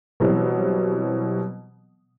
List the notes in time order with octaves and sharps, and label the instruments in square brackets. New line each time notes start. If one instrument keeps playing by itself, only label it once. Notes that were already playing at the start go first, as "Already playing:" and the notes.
[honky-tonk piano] B2 E3 F#3 G3 C4